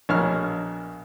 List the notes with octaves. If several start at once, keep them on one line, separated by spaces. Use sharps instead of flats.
A#1 B2 C#5 F6